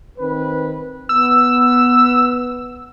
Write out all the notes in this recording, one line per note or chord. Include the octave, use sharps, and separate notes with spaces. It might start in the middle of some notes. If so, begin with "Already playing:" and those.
D#3 C4 B4
B3 E6